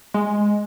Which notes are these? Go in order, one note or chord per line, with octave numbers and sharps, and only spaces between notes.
G#3